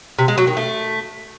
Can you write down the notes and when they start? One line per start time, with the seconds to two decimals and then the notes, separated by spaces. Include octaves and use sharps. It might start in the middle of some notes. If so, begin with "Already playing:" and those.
0.19 C3
0.28 G#3
0.38 F#3
0.47 D#3
0.57 A3